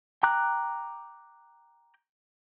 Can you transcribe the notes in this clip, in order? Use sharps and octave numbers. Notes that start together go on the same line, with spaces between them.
G5 A#5 D6 F#6